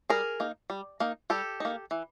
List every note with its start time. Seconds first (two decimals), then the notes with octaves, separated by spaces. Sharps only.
0.10 G3 G#4 A#4
0.40 A#3 D#4
0.70 G3
1.00 A#3 D#4
1.30 G3 G4 A4
1.60 A#3 D#4
1.91 E3